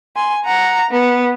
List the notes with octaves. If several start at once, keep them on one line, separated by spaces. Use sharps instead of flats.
G#5 C6
F#5 A#5
B3